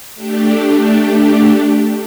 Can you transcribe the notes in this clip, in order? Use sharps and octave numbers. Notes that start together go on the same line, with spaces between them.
A3 D4 G4